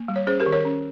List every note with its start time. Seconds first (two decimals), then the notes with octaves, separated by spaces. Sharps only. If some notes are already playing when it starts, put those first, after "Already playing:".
Already playing: A#3
0.08 G3
0.16 C#5
0.27 C#4 G#4 C5
0.40 G4 A#4
0.46 D#3
0.52 A#4 C#5
0.65 C#4